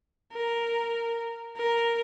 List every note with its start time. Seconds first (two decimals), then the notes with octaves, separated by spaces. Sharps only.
0.33 A#4
1.57 A#4